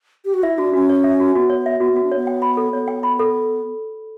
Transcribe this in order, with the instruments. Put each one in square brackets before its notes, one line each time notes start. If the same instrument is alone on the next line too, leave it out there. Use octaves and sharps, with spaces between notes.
[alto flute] G4
F#4
[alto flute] E4 [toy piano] E5
[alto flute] D4 [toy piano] F#4
[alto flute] C#4 [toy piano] F#4
[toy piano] C#5
E5
F#4
[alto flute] B3 [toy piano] F#4
[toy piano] C#5
E5
[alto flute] B3 [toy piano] F#4
[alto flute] B3 [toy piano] F#4
[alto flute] D4
[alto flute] B3 [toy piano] C#5
[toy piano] G5
B5
A4
[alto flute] B3 [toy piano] C#5
[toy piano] G5
B5
A4